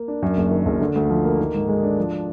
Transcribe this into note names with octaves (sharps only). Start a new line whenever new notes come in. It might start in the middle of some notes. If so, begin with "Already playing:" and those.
Already playing: A#3
D4
F#2
F#1
D#3
F#1
D3
D2
F3
A#3
D#3
G#2
G#3
D4
F3